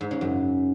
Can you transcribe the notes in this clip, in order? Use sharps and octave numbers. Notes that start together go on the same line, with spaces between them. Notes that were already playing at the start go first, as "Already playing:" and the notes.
G#2
C#3
F#2